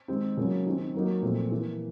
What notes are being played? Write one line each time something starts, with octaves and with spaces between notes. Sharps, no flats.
D#3 G#3 C4 D#4 G4
C#3 F#3 A#3 C#4
D#3 G3 C4
F#3 A#3 D#4
A#2 F3 A3 C4
E3 G3 A#3